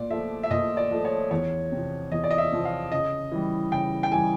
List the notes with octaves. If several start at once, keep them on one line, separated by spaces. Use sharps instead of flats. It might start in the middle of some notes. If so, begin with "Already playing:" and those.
Already playing: A#2 D5
F3 A3 E5
E5
A#2 D#5
D5
F3 A3
C#5
E2 C#5
C3 F3
E2 D#5
D5
D#5
E5
C3 F3
F5
C#3 D#5
E3 G3
C#3 G5
G5
E3 G3 G#5